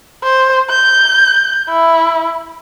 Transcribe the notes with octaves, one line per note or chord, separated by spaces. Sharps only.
C5
G6
E4